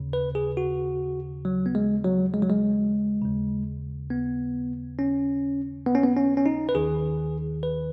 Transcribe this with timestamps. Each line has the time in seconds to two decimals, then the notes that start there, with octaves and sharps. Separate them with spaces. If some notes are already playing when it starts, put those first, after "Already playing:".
Already playing: D#2 C#3
0.13 B4
0.35 G#4
0.57 F#4
1.45 F#3
1.66 B3
1.75 G#3
2.04 F#3
2.34 G#3
2.42 F#3
2.50 G#3
3.22 D#2 C#3
4.10 B3
4.99 C#4
5.87 B3
5.95 C#4
6.04 B3
6.17 C#4
6.37 C#4
6.46 D#4
6.69 B4
6.75 D#2 D#3 G#4
7.63 B4